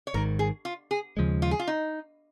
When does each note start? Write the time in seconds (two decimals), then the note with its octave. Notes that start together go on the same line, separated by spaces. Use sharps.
0.07 C#5
0.14 G#1 G#2 D#3 A#4
0.39 G#4
0.65 F4
0.91 G#4
1.17 D#2 C#3 F3 G#3
1.42 F4
1.51 G#4
1.59 F4
1.67 D#4